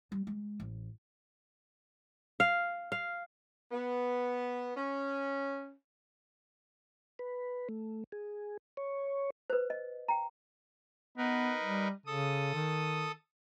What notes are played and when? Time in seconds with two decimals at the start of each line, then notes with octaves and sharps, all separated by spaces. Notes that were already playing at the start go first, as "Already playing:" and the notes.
0.12 G3
0.27 G#3
0.60 A1
2.40 F5
2.92 F5
3.72 B3
4.77 C#4
7.19 B4
7.69 A3
8.12 G#4
8.77 C#5
9.50 B4 C5
9.70 D#5
10.08 G5 A#5
11.17 B3 D#4 A#4 B4
11.63 G3
12.06 C#3 A4 D#6
12.54 D#3